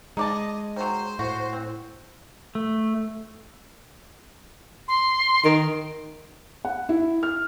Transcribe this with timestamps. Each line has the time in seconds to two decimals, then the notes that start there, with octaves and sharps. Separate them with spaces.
0.17 G#3 D#4 D5 D#5 A5
0.76 D#3 F#3 C5
1.19 A2 F#4
1.53 C4
2.55 A3
4.88 C6
5.45 D#3 D7
6.65 F#5
6.89 E4
7.23 F6